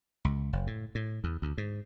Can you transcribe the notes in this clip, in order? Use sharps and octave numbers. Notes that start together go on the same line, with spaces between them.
C#2
F#1
A2
A2
E2
D2
G#2